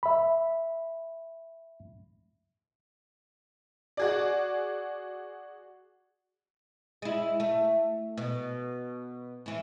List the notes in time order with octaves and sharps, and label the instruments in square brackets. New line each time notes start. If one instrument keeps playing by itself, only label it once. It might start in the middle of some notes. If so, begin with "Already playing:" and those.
[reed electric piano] E5 B5
[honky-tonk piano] F#4 G#4 D5
[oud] G#3 E4
A3
B2
A2 E3